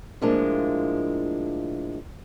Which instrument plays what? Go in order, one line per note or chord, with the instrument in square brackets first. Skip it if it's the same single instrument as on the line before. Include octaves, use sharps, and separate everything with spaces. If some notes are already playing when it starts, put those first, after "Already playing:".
[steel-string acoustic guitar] A2 F3 G#3 A#3 D4